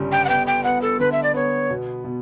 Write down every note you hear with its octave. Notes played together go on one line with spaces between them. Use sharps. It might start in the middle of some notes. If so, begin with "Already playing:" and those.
Already playing: G1 C#3 G3
G5
F#5
B3 G5
G5
B3 F#5
A4
D3 B4
E5
D5
B3 C#5
B2
B2